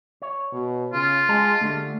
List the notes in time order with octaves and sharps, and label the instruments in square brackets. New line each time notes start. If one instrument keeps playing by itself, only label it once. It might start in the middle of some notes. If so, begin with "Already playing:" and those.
[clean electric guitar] C#5
[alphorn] B2
[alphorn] C#3 [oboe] F4
[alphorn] G#3 [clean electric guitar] A5
[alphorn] D3 [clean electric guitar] A3 G4